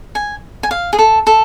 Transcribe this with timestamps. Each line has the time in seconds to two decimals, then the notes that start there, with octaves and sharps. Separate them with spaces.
0.15 G#5
0.63 G#5
0.71 F5
0.93 G#4
0.99 A4
1.27 A4